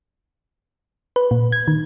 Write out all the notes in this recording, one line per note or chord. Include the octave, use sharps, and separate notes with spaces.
B4
A#2
G#6
D#3